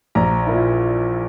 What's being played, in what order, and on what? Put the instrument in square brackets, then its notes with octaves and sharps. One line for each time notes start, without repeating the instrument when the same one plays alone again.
[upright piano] A#1 A#5
A#2 A#3 E4